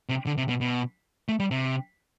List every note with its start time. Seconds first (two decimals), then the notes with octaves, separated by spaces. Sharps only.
0.09 C3
0.26 D3
0.38 C3
0.49 B2
0.61 B2
1.29 A3
1.40 G3
1.51 C3